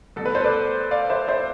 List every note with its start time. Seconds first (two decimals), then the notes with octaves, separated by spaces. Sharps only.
0.16 C2 B2 A3 A4
0.26 B4
0.35 A4 C5
0.44 B4 D5
0.91 D5 F5
1.10 C5 E5
1.28 C5 E5